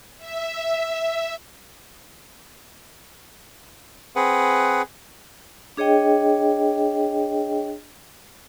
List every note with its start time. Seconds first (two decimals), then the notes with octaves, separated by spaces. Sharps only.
0.18 E5
4.16 C4 G#4 B4 F#5
5.77 D4 G#4 C#5 D#5 G5